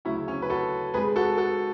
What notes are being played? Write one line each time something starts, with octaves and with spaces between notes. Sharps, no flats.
D2 C#3 F#3 C#4 E4
C#4
B4
F#4 A4
G#2 G#3 G#4 B4
F#4 A4
F#4 A4